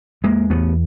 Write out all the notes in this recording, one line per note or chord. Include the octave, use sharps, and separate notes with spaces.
E2 G#3 A#3
E2 A3 B3